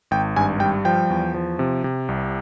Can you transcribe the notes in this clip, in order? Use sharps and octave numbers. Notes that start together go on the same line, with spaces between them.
G#1 G5
G2 G#5
G3 G5
F3 G5
E2
F3
C3
C3
C2